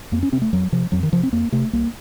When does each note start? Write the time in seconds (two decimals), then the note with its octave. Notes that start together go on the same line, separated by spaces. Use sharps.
0.12 F2 A#3
0.23 C#4
0.32 C3 C4
0.42 A3
0.53 F2 F#3
0.72 C3 F3
0.92 F2 F#3
1.03 D#3
1.12 C3 F3
1.23 C4
1.33 F2 A#3
1.52 C3 A3
1.73 C2 A#3